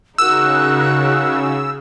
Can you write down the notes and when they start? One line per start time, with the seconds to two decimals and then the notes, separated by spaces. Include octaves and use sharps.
0.18 C#3 D#4 F#4 A#4 E6 F#6